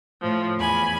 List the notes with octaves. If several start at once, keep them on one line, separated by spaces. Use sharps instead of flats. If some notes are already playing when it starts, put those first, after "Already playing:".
A2 F3
E2 G#5 B5